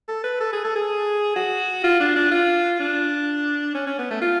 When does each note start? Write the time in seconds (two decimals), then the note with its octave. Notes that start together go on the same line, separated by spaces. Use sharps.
0.08 A4
0.24 B4
0.40 A4
0.53 G#4
0.65 A4
0.76 G#4
1.36 F#4
1.84 F4
2.00 D4
2.16 D4
2.31 F4
2.80 D4
3.75 C#4
3.87 C#4
3.99 B3
4.11 A3
4.22 F4